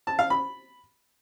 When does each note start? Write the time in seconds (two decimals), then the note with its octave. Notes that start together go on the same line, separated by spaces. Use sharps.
0.07 A5
0.19 F5
0.30 B5